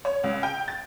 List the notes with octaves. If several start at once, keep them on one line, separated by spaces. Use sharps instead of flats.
C#5
C#2
G5
A6